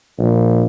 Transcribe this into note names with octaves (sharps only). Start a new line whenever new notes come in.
A#1